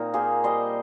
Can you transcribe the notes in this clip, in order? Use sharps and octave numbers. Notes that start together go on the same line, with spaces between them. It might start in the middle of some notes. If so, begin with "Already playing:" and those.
Already playing: A#2 C4 D#4 F4 A#4
A#3 G#4 C5
G3 C5 D#5